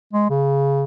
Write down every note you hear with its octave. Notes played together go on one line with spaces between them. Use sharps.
G#3
C#3